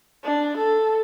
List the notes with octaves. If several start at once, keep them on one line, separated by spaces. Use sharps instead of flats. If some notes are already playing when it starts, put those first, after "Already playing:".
D4
A4